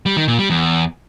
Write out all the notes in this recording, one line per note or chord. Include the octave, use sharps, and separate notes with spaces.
G3
D#3
A#2
G3
E2